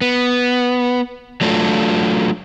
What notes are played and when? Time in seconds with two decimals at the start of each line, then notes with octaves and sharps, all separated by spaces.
0.01 B3
1.41 F#3 A3 D4 F4